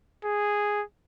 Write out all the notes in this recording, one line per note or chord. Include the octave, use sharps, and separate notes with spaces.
G#4